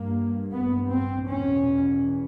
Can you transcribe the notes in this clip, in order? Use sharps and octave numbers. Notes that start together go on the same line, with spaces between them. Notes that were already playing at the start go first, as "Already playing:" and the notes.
Already playing: G2 A#3
B3
C4
E2 B2 C#4